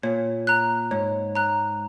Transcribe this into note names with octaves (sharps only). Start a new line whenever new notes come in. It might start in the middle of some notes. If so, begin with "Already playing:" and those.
A#2 C#5
A#5 F#6
G#2 C#5
A#5 F#6